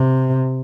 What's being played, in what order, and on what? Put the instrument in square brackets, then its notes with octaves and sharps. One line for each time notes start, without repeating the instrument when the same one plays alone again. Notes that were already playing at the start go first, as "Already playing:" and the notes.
Already playing: [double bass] C3